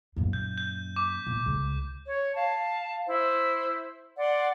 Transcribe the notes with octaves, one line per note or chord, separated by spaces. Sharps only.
F#2 A#2
G6
G6
D6
A#2
C#2
C#5
F5 A5
E4 C5
D5 F#5 C6